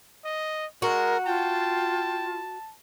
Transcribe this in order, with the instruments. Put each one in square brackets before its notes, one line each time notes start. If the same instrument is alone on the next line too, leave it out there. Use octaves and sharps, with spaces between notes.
[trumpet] D#5
[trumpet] G#3 [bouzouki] F#4 [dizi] A#4
[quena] F4 [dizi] G5 [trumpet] A5